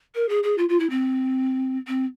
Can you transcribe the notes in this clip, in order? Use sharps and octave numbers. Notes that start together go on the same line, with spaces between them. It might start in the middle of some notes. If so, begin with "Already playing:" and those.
A#4
G#4
G#4
F4
F4
E4
C4
C4